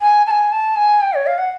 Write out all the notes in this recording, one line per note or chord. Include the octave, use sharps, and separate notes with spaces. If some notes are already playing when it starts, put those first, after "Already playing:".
G#5
A5
G#5
A5
G#5
G5
C#5
F5
F#5